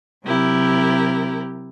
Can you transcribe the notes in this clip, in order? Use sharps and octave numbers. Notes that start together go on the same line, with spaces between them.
C3 F#3 E4 G4 A#4